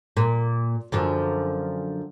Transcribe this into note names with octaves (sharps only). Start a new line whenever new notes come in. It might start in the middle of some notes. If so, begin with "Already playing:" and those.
A#2
F#2 D3 F3